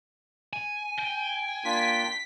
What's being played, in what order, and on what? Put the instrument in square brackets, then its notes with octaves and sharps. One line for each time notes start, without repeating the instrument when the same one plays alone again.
[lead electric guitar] G#5
[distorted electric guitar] G5
[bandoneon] A#3 D4 F4 [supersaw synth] B6